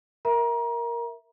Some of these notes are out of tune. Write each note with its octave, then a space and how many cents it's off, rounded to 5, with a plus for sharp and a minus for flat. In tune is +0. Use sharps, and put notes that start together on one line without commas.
A#4 +0 E5 +0 A#5 +30